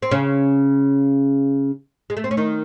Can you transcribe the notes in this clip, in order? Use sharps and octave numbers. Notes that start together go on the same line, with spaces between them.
C4
C#3 C#4
G#3
A3
C4
C#4
D#3 D#4